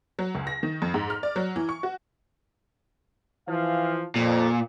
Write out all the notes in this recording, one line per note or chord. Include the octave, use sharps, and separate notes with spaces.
F#3
C#2
A#6
D#3
F2
G#2
F6
D5
F#3
E3
C#6
F#4
E3 F3 F5
F2 A#2